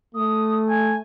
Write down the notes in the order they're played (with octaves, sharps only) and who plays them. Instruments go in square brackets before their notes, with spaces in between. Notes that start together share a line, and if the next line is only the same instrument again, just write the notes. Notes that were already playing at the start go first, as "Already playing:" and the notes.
[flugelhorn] A3 [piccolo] D#6
[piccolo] G#5